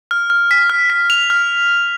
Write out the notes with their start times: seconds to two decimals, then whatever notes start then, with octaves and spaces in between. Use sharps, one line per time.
0.11 F6
0.30 F6
0.51 B6
0.70 F6
0.90 B6
1.10 F7
1.30 F6